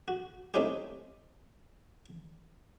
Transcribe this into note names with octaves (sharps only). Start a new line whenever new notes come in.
F#4
A3 C4 C#4 D#4 E4 G4